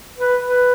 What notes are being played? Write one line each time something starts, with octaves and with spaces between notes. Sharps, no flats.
B4
B4